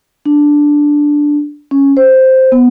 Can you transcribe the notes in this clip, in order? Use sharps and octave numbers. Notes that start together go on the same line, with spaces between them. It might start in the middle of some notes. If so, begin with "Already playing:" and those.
D4
C#4
C5
B3